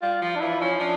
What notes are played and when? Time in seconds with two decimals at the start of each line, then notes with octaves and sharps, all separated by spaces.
0.02 G3 F4
0.22 F3 F4
0.35 D4
0.41 E3 E4
0.61 F3 C#4
0.80 F3 D4